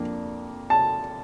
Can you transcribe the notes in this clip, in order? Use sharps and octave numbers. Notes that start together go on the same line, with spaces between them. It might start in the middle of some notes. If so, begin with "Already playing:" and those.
Already playing: F2 A#3 D4
A5